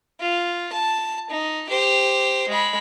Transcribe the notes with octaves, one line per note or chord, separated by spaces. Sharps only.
F4
A5
D#4
G4 C5
G#3 B5